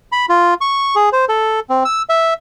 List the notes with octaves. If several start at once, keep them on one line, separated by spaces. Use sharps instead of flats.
B5
F4
C#6
G#4
C5
A4
C4
E6
E5